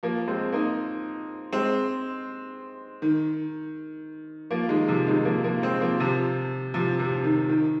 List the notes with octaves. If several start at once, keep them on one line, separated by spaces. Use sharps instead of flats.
F3 A#3
G#3 C4
A#3 D#4
G#3 C4
D#3
F3 A#3
D#3 G#3
C3 F3
D#3 G#3
F3 A#3
F3 A#3
G#3 C4
F3 A#3
C3 F3
C3 F3
C3
D#3
D#3